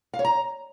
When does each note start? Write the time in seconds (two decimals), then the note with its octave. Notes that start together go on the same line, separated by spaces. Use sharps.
0.14 F5
0.19 C#5
0.25 A#5